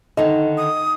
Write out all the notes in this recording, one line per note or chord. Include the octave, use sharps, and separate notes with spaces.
D3 D#3 D#4 D#5
D#6